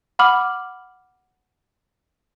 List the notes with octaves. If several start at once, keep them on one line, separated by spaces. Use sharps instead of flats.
F#5 B5 D6 F6 F#7